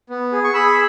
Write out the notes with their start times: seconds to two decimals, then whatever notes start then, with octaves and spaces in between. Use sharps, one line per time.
0.10 B3
0.32 G#4
0.44 C#6
0.54 G#4 B5 E6